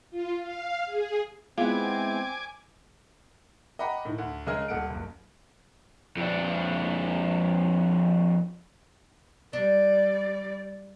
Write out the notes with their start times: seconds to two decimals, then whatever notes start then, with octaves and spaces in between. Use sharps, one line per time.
0.11 F4
0.41 F5
0.86 G#4
1.58 G#3 B3 C4 E4 F4 G#5 D6
3.79 D#5 F#5 G5 A#5 B5 D6
4.05 A2 D#3
4.18 D2
4.46 C#3 G#3 A#4 D#5 G#5 F6
4.68 D#1 A4 F#5 C#7 D7
4.90 F#1 C#2
6.17 F2 D4
9.53 G3 D4 D5